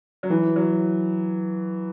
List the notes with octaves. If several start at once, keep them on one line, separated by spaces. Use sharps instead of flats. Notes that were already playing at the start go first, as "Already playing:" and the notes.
F#3
E3
F#3